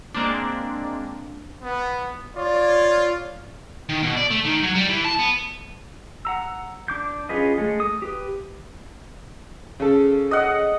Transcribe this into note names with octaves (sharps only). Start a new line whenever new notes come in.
G#3 A#3 C4 D4
B3
F4 C#5 D5
D#3
B2
D5
A3
D#3
F#3
G3
E3
A5
B3
F#5 A#5 E6
D4 D6 G6
C#4 F4 G#4 B4 D#5
G#3 A3
D#6
G4 B4
C#3 A4
D#5 F#5